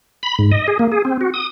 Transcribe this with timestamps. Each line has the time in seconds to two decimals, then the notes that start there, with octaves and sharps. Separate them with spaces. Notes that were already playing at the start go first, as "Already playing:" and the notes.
0.23 B5
0.39 G#2
0.51 D#5
0.68 G#4
0.79 A#3
0.92 G#4
1.05 C4
1.21 F#4
1.34 D#6